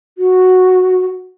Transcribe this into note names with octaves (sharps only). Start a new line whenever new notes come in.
F#4